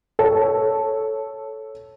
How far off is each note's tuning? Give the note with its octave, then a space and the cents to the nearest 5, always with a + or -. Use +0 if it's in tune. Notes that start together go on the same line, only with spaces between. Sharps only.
A4 +0 C#5 +0